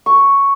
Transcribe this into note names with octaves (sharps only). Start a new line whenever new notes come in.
C#6